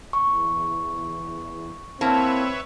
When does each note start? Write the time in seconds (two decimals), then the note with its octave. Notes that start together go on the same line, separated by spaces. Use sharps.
0.13 E2 C#6
2.01 A#3 C4 E4 B4 C#5 E5 A5